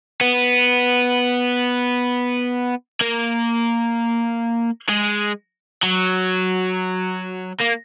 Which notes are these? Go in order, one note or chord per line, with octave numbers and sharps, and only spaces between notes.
B3
A#3
G#3
F#3
A#3